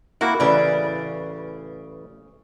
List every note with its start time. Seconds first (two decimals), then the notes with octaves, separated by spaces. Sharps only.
0.21 A#3 E4 F#4 A#4
0.40 A1 C#3 E3 D5